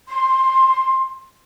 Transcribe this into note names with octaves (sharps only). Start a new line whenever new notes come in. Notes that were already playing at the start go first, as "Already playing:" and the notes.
C6